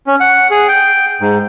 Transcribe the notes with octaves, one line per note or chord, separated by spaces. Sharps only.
C#4
F#5
G#4
G5
G#2